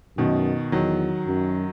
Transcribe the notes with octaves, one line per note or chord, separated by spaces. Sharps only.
F#2 B2 D#3
E2 D#3 F#3
F#2